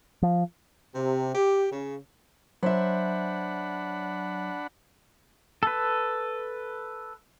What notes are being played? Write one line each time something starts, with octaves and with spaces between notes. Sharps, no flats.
F3
C3
G4
C#3
F#3 D4 C5 E5 F#5 B5
A4 B4